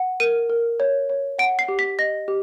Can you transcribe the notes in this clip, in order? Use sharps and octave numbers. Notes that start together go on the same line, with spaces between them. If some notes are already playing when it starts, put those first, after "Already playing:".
Already playing: F#5
A#4 D#7
A#4
C#5
C#5
F#5 D7
C7
G4
B6
D#5 A#6
G4